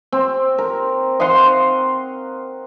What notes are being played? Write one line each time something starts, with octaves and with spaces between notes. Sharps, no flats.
C4
A#4
D#5 F5 F#5 C6